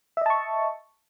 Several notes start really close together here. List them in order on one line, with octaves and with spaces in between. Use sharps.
E5 D#5 A5 C#6